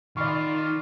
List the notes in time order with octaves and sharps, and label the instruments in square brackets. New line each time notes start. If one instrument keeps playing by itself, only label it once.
[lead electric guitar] D#3 [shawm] F4 [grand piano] D5 B5 C#6